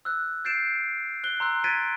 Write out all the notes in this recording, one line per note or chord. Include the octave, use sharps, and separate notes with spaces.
E6 F#6
G6 A6 C7 D7 E7
F#6 G7
A#5 C6 E6 F#6
F#6 G#6 A6 B6 D7 D#7